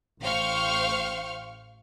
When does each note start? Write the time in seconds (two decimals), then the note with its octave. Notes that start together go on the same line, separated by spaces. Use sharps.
0.22 A1 C5 F5 G5 C#6 F6